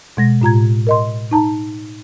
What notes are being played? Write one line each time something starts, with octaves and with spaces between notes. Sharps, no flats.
B2 G#3 A#6
A2 F4 A#5 G#6
A2
A#4 D#5 C6
D#4 A5 A#5